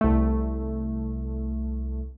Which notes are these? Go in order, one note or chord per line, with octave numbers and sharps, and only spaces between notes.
C2 A3